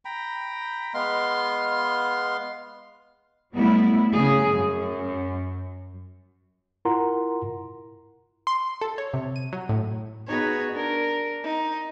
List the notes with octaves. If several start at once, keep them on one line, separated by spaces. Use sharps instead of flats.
G5 A#5 B5
G#3 B3 F5 C6
F#3 G3 A3 B3 E4
C#3 G#4
F#2
E4 F4 A#4 F#5 A#5 C6
C6
A4
C#5
C3
D#7
F#3
A2
B3 D#4 F#4 G#4 B4 C#5
D4 A#4
D#4